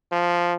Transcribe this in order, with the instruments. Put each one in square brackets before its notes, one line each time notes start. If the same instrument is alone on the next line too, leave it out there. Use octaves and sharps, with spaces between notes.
[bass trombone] F3